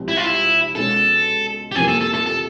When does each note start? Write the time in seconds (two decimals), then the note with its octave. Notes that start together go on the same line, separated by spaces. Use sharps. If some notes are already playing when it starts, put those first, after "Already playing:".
Already playing: C2 C3 F3 G#3 C4
0.08 E4
0.17 F4
0.24 E4
0.75 B2 G#3 C#4 A4
1.72 G4
1.75 F2 C3 E3 G3 A#3 G#4
1.88 A4
2.01 A4
2.14 A4
2.26 A4